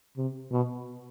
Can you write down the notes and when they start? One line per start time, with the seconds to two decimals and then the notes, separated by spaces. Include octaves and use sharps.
0.17 C3
0.51 B2